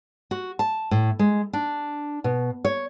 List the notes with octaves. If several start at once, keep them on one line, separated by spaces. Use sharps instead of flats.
F#4
A5
A2
G#3
D4
B2
C#5